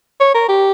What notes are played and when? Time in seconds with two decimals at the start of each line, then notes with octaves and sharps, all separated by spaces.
0.20 C#5
0.34 A#4
0.48 G4